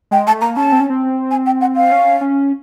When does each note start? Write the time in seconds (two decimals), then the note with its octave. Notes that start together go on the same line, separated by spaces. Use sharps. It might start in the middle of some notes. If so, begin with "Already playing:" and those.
0.11 G#3 G5
0.27 A3 A5
0.41 A#3 A#5
0.57 C#4 A5
0.72 C4
0.80 C#4
0.90 C4
1.31 G#5
1.46 G5
1.61 F#5
1.76 F5
1.92 C#4
2.21 C#4